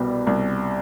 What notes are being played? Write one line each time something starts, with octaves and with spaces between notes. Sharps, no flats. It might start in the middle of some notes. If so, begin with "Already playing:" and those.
Already playing: C2 B2 G3 G4
C2